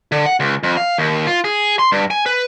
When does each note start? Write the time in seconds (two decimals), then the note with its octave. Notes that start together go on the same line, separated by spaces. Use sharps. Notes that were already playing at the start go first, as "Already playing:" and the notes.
0.12 D3
0.26 F#5
0.40 C#2
0.63 F2
0.77 F5
0.98 D#2
1.27 F4
1.44 G#4
1.79 C6
1.92 G2
2.11 G#5
2.26 B4